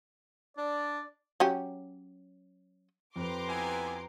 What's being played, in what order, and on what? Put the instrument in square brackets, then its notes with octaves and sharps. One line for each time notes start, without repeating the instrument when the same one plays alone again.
[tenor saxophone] D4 [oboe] D5
[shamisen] F#3 C#4 G4
[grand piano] F2 [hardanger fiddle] G4 B4 [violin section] A#5 C6 D6
[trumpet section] B3 E4 G#5